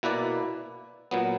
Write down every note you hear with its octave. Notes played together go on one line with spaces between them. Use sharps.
B2 A#3 E4 B4 D5
A#2 F#3 B3